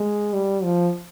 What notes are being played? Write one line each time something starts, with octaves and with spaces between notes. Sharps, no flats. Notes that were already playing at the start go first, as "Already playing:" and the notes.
Already playing: G#3
G3
F3